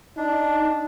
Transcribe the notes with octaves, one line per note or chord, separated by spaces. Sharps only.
D4 D#4